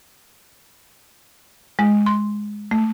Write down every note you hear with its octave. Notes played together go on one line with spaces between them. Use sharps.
G#3
C6
A3